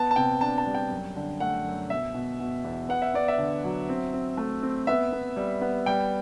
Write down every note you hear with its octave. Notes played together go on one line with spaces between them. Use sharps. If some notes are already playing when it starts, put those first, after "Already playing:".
Already playing: B3 A5
A5
C3 G5
D4 A5
A5
G3
G5
F#2
D3
A3 F#5
F#2
B2 E5
B2
B2
E2
B3 F#5
E5
B3 D5
E5
D3
F#3
C4
C4
A3
C4
B3 E5
B3
G3
B3
G3 G5